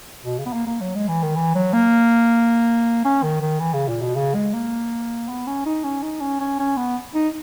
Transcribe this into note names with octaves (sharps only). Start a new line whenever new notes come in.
B2
C#3
B3
A#3
A#3
F#3
G#3
E3
D#3
E3
F#3
A#3
C#4
D#3
D#3
E3
C#3
A#2
B2
C#3
G#3
A#3
B3
C#4
D#4
C#4
D#4
C#4
C#4
C#4
B3
D#4